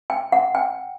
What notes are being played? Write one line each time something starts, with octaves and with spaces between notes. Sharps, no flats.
G5
F#5
G5